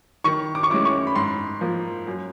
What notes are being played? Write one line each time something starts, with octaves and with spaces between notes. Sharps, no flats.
D#3 C#6
D6
C#6
G#3 C#4 E4 D6
C#6
B5
G#2 C6
F3 A#3
F#2